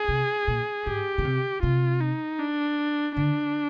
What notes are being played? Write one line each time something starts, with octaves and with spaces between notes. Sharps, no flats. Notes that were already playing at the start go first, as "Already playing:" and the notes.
Already playing: G#4
C3
A#2
G#2 G4
D3
C3
C3 F4
D#4
D4
D3 D4